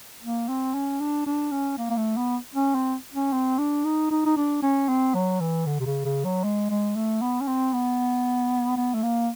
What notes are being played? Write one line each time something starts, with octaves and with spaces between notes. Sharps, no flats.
A#3
C4
C#4
D4
D4
C#4
A#3
A#3
A3
B3
C#4
C4
C#4
C4
D4
D#4
D#4
D#4
D4
C#4
C4
F#3
E3
D3
C3
C#3
C#3
F#3
G#3
G#3
A3
B3
C#4
C4
B3
B3
A3
A#3